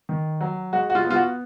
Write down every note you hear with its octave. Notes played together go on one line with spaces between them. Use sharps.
D#3
F#3
G#3 F#4
F#4
F4
B3
F4
F#4